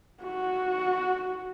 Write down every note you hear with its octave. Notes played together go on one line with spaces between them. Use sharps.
F#4